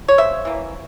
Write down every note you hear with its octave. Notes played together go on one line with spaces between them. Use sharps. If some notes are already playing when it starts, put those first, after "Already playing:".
C#5
C#3 C5 E5
E3 A#3